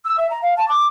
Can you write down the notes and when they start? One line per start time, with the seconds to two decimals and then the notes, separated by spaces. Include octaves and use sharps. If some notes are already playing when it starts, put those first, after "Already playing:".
0.04 E6
0.17 E5
0.30 A#5
0.42 F5
0.56 A5
0.68 D6